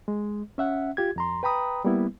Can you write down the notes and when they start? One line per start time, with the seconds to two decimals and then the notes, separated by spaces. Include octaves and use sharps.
0.08 G#3
0.58 C#4 E5 F#5
0.97 F4 G4 G#6
1.16 F2 A#5 C6
1.43 B4 G5 A#5 B5 D#6
1.85 G3 A#3 B3 E4